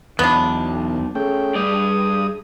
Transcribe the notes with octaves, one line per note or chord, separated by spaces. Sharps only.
B1 E2 B3 D4
A3 C#4 G#4 G5
G2 D5 D#6